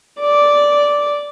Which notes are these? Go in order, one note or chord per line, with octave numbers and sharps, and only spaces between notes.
D5